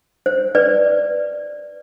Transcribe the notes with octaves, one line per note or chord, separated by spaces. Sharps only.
C5
B4 D5